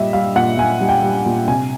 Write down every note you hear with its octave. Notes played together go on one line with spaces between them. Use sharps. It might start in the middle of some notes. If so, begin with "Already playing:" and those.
Already playing: A#2 G3 D#5 E5
G3 F5
A#2 F#5
A#2 G#5
G3
G5
G3
A#2
C3 G#5